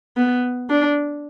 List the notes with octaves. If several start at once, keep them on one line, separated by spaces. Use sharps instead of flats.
B3
D4